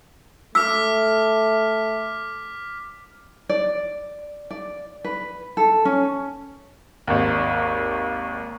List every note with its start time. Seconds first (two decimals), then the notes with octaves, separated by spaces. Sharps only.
0.55 A3 D6 E6 F6 B6
3.49 D5
4.51 D5
5.05 B4
5.57 A4
5.85 C#4
7.07 G#1 D#2